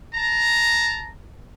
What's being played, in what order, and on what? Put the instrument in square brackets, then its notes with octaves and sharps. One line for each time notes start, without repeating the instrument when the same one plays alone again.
[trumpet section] A5 A#5